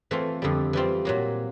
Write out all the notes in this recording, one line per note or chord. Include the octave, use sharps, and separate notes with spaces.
E3 A3 C4 F4
F2 D3 G3
E3 G3 C4 F4
A#2 F#3 A#3